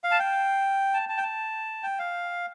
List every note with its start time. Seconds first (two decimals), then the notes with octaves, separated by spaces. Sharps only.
0.04 F5
0.11 A5
0.19 G5
0.94 A5
1.09 A5
1.17 G5
1.23 A5
1.83 G5
1.99 F5